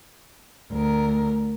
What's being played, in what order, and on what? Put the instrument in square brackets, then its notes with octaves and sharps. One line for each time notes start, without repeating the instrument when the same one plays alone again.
[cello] D2 A#4